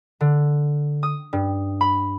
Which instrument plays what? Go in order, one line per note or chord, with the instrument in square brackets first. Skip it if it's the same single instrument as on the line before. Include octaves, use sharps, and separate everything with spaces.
[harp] D3
D#6
G2
B5